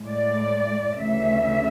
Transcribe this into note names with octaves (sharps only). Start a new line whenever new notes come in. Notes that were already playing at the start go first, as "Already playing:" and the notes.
Already playing: A2 G#3
D5
D2 C#3 E3 A3 E5